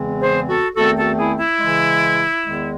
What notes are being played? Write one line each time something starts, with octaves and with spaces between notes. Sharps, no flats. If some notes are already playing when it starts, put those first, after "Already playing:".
Already playing: E2 C#3 E3 G#3 C4
G#4 C5
F#4 A4
E2 D#3 A3 C4 F#4 A4
F#4 A4
E4 G#4
E4
C#3 E3 G#3
E2 D#3 G#3